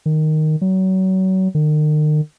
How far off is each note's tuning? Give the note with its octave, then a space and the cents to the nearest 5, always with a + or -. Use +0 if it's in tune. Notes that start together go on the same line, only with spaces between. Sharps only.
D#3 -5
F#3 +30
D#3 -40